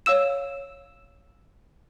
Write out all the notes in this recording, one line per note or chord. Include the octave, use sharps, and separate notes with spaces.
C#5 F5 E6 E7